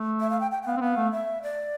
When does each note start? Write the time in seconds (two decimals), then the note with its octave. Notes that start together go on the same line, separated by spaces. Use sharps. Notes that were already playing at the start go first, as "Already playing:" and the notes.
Already playing: A3
0.20 E5
0.30 F5
0.40 G5
0.51 G5
0.62 G5
0.67 B3 F5
0.77 C4
0.81 B3 F5
0.96 A3
1.12 E5
1.43 D5